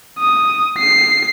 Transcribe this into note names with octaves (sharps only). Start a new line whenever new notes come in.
D#6
C7